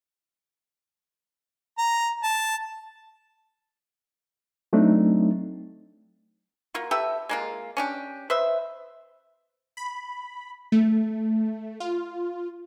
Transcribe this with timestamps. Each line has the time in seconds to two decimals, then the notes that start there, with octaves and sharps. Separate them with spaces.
1.78 A#5
2.23 A5
4.73 F#3 A3 C4 D4 D#4
6.74 A#3 F4 F#4
6.91 G4 A4 B4 E5
7.29 G#3 A#3 F4
7.77 C#4 D4 G4
8.30 B4 C5 D#5 E5
9.77 B5
10.72 A3
11.80 F4